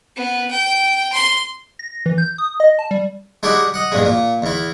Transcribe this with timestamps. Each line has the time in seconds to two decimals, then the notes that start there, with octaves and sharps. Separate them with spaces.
0.17 B3
0.51 G5
1.13 C6
1.79 A#6
2.06 E3
2.18 G6
2.38 D#6
2.60 D#5
2.79 A5
2.91 G3
3.43 G#3 D4 E4 F#4 G4
3.74 D#5 F#5
3.92 A#1 E2 G2 G#3
4.05 A#2
4.42 E2 E4